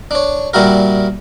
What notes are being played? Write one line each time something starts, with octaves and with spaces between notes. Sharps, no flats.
D4 C#5
A#2 G3 E4 F#4 A#4